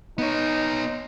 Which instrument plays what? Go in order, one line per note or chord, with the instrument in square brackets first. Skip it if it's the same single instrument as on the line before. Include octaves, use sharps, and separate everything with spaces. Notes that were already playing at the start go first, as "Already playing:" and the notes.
[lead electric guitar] B3 C#5 [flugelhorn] D#4